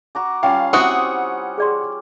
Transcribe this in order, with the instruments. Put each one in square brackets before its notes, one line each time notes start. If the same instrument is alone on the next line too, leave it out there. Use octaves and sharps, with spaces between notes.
[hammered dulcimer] F#4 A#5 D6
[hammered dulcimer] G3 C#4 F4 [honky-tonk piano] F5 [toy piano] G5
[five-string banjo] C4 E4 F#4 [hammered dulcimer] G4 [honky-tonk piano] F#5 D#6 C#7
[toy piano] G#4 D5 C6